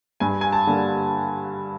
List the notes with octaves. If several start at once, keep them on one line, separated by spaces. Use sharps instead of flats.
G2 G#5
G#5
A5
D3 G3 A#3